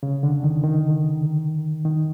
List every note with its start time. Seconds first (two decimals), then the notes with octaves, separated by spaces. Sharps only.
0.03 C#3
0.23 D3
0.44 D#3
0.64 D#3
1.85 D#3